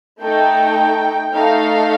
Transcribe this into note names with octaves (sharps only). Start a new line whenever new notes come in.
A3 D#4 A4 G5
A3 D#4 A4 F5